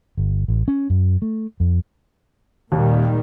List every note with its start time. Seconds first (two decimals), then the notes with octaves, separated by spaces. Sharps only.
0.18 G1
0.48 A1
0.68 C#4
0.90 F#2
1.22 A3
1.60 F2
2.72 D#2 A#2 D#3 G3